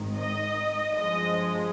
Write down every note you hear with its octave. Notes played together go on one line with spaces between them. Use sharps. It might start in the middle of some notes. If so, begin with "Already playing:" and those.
Already playing: G#1 G#2 D#3
D#5
G2 F3 G#3 D#5